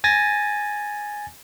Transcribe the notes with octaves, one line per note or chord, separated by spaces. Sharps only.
G#5 A6 A#6